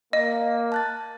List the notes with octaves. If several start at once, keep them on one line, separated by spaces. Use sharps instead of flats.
A#3 D#5
A5 F#6 A6